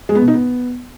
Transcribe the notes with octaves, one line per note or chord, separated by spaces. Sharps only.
G#3
B3
B2
D#4
B3